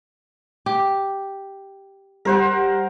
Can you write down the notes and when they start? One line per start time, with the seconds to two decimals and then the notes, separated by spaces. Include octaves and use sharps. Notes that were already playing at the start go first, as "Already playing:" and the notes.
0.66 G4
2.25 G3 A#4 C5 F#5